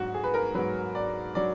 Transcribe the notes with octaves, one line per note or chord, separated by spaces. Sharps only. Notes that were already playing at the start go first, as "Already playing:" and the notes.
Already playing: G#2 F#3 F#4
G#4
B4
A#4
G#2 F#3 B4
D5
F#3 D5